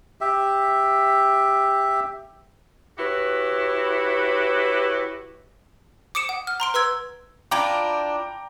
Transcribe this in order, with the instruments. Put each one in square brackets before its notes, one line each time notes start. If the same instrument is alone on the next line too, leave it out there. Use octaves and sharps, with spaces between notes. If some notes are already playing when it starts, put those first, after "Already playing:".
[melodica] G4 E5
[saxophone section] E4 F#4 G4 B4 C#5
[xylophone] D6 D#6 C#7 D7 E7
F#5
F6
A#5 C6 D7
B4 C6 E6 G#6
[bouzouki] D4 E4 F4 [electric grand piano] G5 A#5 D6